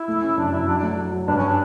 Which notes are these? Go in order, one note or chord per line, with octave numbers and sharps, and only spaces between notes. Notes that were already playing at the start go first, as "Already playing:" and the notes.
Already playing: E4
A3
C#4
F#2 D4
F#2 E4
F#3 D4
A3 D4
F#3
F#3
G2 D4
C#4
D4